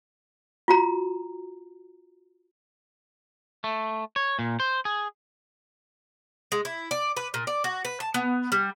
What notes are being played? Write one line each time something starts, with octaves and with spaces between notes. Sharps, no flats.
F4 F#4 A#5
A3
C#5
A#2
C5
G#4
G#3
E4
D5
B4
A#2
D5
F#4
B4
A5
B3
G3